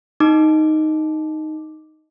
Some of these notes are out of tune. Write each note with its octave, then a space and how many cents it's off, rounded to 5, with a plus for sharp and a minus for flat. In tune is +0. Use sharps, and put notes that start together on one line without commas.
D#4 +0 D6 +0